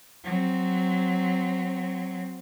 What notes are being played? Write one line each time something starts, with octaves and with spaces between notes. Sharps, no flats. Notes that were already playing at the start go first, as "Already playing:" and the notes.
F#3 C4